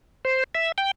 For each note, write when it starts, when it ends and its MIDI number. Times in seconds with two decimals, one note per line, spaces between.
0.25 0.44 72
0.55 0.72 76
0.78 0.91 79